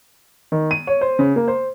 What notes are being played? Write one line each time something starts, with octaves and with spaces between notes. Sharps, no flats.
D#3
D#7
C#5
C5
C#3
A#3
C5